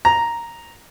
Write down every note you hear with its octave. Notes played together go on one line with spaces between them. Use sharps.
A#5